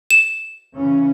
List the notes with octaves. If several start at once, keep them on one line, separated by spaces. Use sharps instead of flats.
E7
C#3 E3 C#4